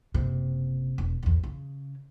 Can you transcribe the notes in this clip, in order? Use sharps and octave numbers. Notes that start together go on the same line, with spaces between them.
F#1 C3
E1
A1 E2
C#3